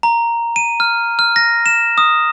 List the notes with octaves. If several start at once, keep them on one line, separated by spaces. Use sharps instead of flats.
A#5
D#7
F6
F6
A#6
E7
D#6